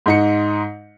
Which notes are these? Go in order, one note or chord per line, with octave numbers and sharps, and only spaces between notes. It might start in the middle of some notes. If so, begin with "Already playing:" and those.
G#2 D#4 C#7